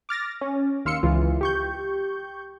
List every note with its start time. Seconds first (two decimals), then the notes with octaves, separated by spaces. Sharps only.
0.09 D6 F6 A6 A#6
0.41 C#4
0.85 D#2 F5 C6 E6 C#7
1.03 C#2 E3 F4
1.41 G4 C#6 G6